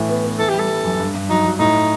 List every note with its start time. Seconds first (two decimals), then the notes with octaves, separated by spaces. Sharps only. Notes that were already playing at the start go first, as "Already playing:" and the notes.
Already playing: A2 E3
0.09 B3
0.24 B3
0.39 E3 A4
0.49 G4
0.54 G3 A4
0.69 G3
0.84 F#2
0.99 G2
1.15 G2
1.29 F#3 D#4
1.45 F#3
1.59 A2 D#4